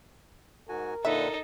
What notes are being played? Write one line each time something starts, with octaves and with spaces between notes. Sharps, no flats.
G#2 F#4 A#4 G#5
A#2 D3 D#4 A4 B4 E5